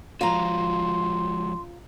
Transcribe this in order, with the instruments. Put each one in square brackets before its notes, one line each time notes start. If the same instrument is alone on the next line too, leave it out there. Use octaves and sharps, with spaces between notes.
[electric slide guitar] F3 G#3 F#4 [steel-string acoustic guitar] F4 A#5 [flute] C6